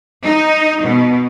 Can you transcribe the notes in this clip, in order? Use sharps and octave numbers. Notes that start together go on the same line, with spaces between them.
D#4
B2